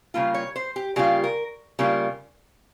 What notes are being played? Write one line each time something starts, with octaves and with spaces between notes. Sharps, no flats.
C#3 G3 A#3 F4
C#5
C5
G4
C#3 G3 A#3 F4 G4
A#4
C#3 G3 A#3 F4